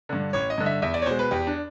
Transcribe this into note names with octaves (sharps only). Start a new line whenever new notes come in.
G2 D3
A1 C#5
D#5
G2 D3
E5
E2 E5
D5
C#5
B2 G#3 C5
B4
E2 G4
D4